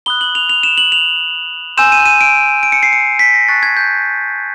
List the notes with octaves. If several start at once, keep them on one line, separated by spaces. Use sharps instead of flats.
B5 D#6 F#6 G7
F#7
F7
F7
E7
F#7
F7
G#5 C6 E6 G6 E7
D#7
D#7
D7
D7
C#7
C7
C#7
B6
A#6
A5 C#6 F#6 A6
G#6
G6